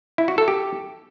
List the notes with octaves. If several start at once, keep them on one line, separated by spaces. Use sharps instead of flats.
E4
F#4
A4
G4